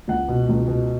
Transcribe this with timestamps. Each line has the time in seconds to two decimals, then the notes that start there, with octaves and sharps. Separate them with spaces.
0.08 C#2 F#5
0.28 B2
0.49 C#2
0.68 B2